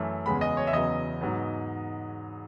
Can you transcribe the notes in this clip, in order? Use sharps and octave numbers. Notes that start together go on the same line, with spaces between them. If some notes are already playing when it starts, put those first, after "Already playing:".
Already playing: F#2 E3 A3
E2 C#3 G#3 B3 B5
D#5
C#5
E5
E2 C#3 F#3 B3 D#5
G#2 F#3 B3